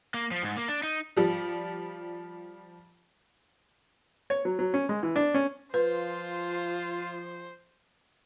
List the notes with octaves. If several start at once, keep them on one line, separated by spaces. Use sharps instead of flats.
A#3
F3
G#2
A#3
D4
D#4
F3 G3
C#5
F#3
F#3
C#4
G#3
E3
D4
C#4
F3 F4 B4 C5